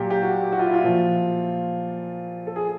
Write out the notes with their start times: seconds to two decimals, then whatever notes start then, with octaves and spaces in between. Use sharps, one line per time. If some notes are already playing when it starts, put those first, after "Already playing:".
Already playing: A#2 F#3 G4
0.10 G4
0.22 F#4
0.52 F#4
0.59 F4
0.66 E4
0.74 F4
0.82 A#2 F3
2.47 A4
2.56 G#4